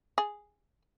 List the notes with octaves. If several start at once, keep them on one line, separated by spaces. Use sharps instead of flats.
G#4